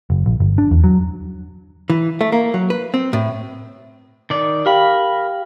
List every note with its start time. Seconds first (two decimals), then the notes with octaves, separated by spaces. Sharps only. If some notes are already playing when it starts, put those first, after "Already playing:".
0.10 F#1
0.26 A#1
0.40 G1
0.58 D4
0.71 E2
0.84 F#3
1.90 E3
2.21 A3
2.32 A#3
2.54 F#3
2.70 B4
2.94 C4
3.13 A2
4.30 D#3 D5
4.66 G4 A#4 F5 G5 B5